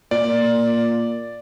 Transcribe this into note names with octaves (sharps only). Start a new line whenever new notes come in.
A#2 D5